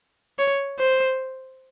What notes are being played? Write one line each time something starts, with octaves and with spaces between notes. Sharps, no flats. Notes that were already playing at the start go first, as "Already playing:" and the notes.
C#5
C5